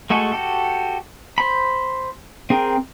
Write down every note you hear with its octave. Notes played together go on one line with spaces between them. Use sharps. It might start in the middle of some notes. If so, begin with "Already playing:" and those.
G#3 A3 F#4 G#4 A4
F#4 G4 A4
C5 B5
C4 G#4 A#4 G5